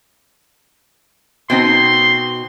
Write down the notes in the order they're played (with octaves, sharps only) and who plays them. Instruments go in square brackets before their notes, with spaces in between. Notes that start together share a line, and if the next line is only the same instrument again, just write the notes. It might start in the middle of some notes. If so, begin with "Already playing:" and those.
[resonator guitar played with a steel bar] B2 C4 D#4 [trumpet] C6